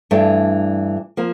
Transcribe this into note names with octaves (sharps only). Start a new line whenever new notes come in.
G2 E3 A3 D4
F3 A#3